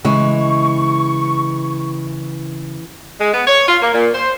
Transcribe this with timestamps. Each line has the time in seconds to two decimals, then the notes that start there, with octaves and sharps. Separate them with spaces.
0.05 C#3 E3 G#3 E4 C#6
3.20 G#3
3.34 B3
3.48 C#5
3.69 F4
3.83 A#3
3.94 A#2
4.15 C5